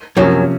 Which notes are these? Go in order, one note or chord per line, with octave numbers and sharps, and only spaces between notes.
F#2 C3 F3 F#3 A#3 C#4